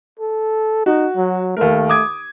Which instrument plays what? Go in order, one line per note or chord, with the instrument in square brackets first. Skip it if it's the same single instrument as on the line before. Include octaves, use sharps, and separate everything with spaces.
[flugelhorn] A4
[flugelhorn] D#4 [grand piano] F#4
[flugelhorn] F#3
[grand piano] D#2 A#4 [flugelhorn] A3
[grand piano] D6 D#6 G#6